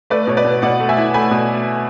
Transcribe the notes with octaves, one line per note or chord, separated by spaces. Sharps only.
A3 B4 D5
B2 C#5
B4 D5
B2
B2 D5 F#5
A3
E5 G#5
E4
A3 G#5 B5
B2